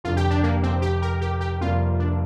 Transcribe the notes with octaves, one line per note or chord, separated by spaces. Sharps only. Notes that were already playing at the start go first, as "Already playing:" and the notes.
F1 F2 D3 F4
G4
D4
A#3
C4
G4
A#4
G4
G4
F1 F2 C3 G3 A#3 F4
D4